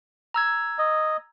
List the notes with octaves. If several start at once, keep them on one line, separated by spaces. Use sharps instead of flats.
A#5 E6 G#6
D#5